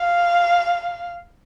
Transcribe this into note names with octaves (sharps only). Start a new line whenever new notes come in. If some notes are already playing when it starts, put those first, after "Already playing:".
Already playing: F5